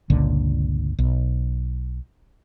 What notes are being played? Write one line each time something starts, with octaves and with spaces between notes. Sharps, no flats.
G1 C#2 A#2 D3
B1